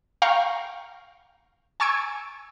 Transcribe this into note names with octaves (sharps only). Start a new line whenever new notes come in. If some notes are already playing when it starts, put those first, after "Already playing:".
F5 G5 A#5 C#6
G#5 A5 C#6 E6 G#6 D7